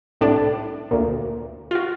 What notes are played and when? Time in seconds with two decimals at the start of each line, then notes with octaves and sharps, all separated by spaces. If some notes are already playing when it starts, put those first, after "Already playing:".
0.21 C2 A2 D4 D5
0.91 D2 A#2
1.71 F4 F#4